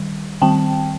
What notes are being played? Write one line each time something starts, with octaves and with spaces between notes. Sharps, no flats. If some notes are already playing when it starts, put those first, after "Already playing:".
Already playing: D#3 G3
D#3 G3 C4 G5 A5